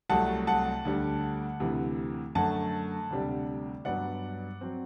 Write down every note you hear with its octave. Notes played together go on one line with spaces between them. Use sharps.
C2 C3 F#3 A3 F#5 A5
F#5 A5
D2 D3 G3
D2 C3 E3
F#2 D3 A3 F#5 A5
D2 C3 G3 D4
G2 F#3 B3 D4 D5 F#5
F#3 C4